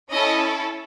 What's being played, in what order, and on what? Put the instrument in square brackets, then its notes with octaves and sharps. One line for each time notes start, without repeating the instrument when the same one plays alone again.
[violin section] C#4 E4 A4 D#5